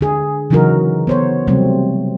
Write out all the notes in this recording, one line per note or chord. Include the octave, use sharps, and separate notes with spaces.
D3 G#4
C#3 E3 F#3 D#4 F#4 A#4
B3 C5 C#5
C3 F#3 G3 A3 C4